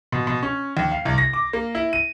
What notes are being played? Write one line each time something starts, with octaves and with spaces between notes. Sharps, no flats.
B2
B2
C#4
D#2
F5
C2
A#6
D6
A#3
E4
D#7